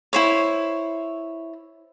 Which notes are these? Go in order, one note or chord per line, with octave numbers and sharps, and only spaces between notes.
E4 C5 C#5